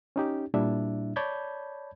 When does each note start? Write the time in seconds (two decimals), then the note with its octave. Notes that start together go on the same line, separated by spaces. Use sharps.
0.16 C#4 D#4 G4
0.54 A#2 G3 D4 E4 E5
1.16 C#5 D5 A5 B5 G6 G#6